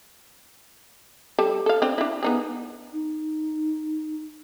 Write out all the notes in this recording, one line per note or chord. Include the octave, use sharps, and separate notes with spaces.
G3 A4
A4 F5
C4 D4
D4 E4
B3 D#4 G#4
D#4